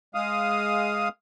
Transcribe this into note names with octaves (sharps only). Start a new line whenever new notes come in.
G#3 F5 D#6